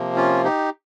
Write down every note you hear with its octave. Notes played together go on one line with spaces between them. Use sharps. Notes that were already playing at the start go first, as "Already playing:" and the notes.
Already playing: C3 F3 A#3
C#4 F4
D#4 G4